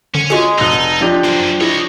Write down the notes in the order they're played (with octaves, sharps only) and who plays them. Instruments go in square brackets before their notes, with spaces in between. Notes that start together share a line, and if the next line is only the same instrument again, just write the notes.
[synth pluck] D3 [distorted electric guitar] C#4
[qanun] G#3 G#4 [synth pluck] F4 F#4 A4
[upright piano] F1 D#6 F7 [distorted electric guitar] D#4 [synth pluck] E6 F#6
[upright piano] F3 D4 G4
[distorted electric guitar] F#3 A#3 [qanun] C5 G5
[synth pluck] E4 G#4 [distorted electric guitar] C#5 D#5